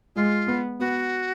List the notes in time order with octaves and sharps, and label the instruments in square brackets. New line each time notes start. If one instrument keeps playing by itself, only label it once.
[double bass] G#3 [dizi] F4
[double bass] B3
[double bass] B3 [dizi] F#4